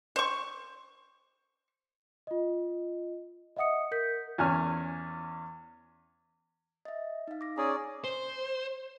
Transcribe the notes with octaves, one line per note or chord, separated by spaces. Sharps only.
C5 C#6
F4 D#5
D#5 E5 F#5 D#6 C#7
A#4 G6 B6
E2 C#4 G#5 F6
D#5 E5
D#4 F5
D6 A#6
C#4 G#4 D5 A#5
C5